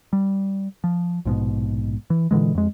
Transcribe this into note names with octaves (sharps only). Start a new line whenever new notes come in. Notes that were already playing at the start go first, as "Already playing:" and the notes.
G3
F3
A#1 G#2 B2
E3
A#2 D3 E3 G#3
F2 G#3